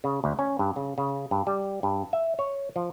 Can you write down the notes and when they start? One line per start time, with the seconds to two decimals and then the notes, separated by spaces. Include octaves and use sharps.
0.04 C#3
0.24 D2
0.39 C#4
0.59 G2
0.76 C#3
0.98 C#3
1.31 G2
1.47 G3
1.83 G2
2.13 E5
2.39 C#5
2.76 F3